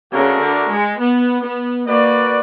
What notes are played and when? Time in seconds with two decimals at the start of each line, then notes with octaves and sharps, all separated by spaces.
0.12 C#3 A3 D4 F#4 A#4
0.41 D3
0.70 G#3
0.99 B3
1.43 B3
1.86 A#3 F#4 B4 D5